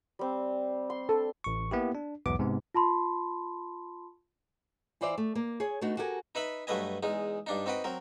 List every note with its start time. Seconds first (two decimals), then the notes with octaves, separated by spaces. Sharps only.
0.19 G3 C4
0.90 C6
1.09 A4
1.44 A1 C#6
1.71 A#3 B3 E4 G4
1.95 D4
2.26 B1 E2 G#2 B2 B3 D6
2.39 G#2 C3 B3
2.74 F4 A5 B5 C6
5.01 E3 E4 C5 D5 E5 F5
5.18 A3
5.35 A#3
5.60 G#4 C#5
5.81 A3 B3 D4 D#4 F#4
5.97 F#4 G4 A4 A#4 E5 G#5
6.35 D#4 B4 E5 B5
6.67 G2 F#3 A3 B4 D#5 G#5
7.03 E2 G#3 D#4
7.47 G2 D4 D#4
7.66 C4 D#4 F#4 B4 G5
7.84 F#3 C4 A#4